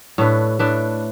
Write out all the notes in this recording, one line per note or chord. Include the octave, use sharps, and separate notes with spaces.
A2 A3 D4 B4
A2 A3 D4 B4